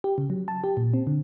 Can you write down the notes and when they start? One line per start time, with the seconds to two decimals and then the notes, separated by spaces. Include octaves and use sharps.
0.04 G4
0.18 C#3
0.30 F#3
0.48 A5
0.64 G4
0.77 A#2
0.94 C4
1.07 D3